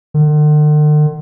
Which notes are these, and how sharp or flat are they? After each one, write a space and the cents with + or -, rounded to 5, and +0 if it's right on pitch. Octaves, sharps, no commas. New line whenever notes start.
D3 +45